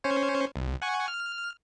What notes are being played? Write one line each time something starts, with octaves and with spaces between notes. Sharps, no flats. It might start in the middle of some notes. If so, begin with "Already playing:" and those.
C#4 C5 C#5
C2
F#5 G#5 C#6
F6